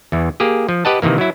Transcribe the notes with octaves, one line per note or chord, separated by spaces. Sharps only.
E2 E3
A#3 G4 G#4
F3
G4 B4 D#5 F#5 A5
C3 D#3 E3 A#3
F#3 E4